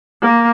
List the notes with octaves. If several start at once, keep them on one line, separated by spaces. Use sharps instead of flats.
A#3